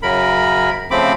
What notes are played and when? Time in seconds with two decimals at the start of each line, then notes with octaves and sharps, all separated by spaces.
0.03 F#2 C#3 A#4 B5
0.91 C#3 F3 A3 C4 B5 D6